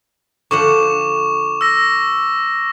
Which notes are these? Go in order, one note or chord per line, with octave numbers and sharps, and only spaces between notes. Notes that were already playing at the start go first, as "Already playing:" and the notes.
D3 F3 F#5 C#6 D6 E7
E6 A#6